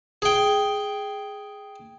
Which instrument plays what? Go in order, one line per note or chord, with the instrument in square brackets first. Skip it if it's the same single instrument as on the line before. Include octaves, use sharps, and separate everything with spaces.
[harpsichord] G#4 G5